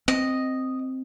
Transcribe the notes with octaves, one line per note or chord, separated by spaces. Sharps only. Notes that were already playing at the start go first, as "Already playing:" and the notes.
C4 D#5